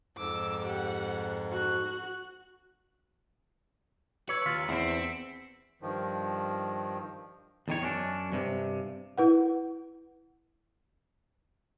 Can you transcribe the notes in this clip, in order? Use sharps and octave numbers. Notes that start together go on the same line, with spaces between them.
F2 G#2 D6 E6
G4 F#5
F#4 F#6
B4 C#5 E6 C#7
D#2 F4 B6
E2 C4
G2 D#3 F3
E2 D#3 C#5
F#2 C#4 D4
G2 C3
E4 B4 F#5